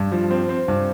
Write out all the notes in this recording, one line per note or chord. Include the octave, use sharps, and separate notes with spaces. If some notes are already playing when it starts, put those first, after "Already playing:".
Already playing: G2
F3
C4
C4
G2